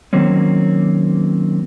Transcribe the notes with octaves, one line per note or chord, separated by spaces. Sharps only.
D#3 F#3 A#3 C4 C#4